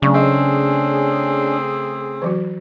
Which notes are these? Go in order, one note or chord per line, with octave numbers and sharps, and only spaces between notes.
C#3 F#3 A3 C#4 D4 C#6
A3 C4 G#4 D#5
E3 F#3 F#4